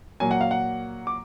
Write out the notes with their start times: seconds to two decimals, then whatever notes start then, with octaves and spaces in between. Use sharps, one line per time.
0.20 A#2 F#3 A#3 G#5
0.31 F#5
0.41 F5
0.51 F#5
1.07 D6